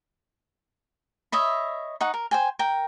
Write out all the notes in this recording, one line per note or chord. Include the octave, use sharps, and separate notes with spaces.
C#5 D#5 E5 B5
D#4 F#5 C#6
A#4
C5 G5 G#5
A#4 G5